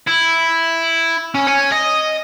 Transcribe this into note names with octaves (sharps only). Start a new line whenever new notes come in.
E4
C#4
C#5 G#5
D#5